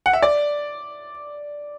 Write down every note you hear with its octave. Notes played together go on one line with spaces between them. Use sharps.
F#5
E5
D5